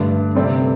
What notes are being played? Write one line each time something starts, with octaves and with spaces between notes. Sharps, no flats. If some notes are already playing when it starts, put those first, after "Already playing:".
Already playing: G2 D3 A3 D4
C3 G3 C4 A4 D5